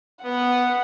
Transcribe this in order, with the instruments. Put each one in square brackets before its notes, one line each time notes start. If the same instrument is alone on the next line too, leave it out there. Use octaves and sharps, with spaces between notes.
[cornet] B3 [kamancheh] F#5